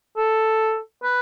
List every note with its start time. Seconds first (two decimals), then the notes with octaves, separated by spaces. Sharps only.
0.17 A4
1.03 B4